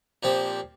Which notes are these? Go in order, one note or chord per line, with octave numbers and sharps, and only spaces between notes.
A#2 F3 C4 G4